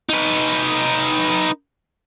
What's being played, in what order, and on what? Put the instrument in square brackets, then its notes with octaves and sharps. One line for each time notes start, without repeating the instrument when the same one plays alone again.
[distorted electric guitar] D#4 B4